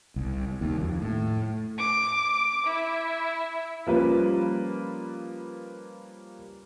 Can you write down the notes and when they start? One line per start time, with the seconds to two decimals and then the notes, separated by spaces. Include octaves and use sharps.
0.16 C2
0.61 D#2
0.80 F2
1.02 A2
1.78 D6
2.66 E4
3.86 F3 G3 A#3 C#4 F4 B4